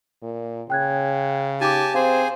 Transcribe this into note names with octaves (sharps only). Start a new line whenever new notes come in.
A#2
C#3 G5 F#6 G#6
D#4 G4 G#5 A5 D6
C4 G#4 C5 F5 G#5